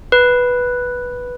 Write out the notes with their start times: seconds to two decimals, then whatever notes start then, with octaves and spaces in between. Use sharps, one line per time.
0.12 B4